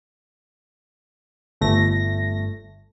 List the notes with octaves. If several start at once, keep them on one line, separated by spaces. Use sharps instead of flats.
G1 A3 A#6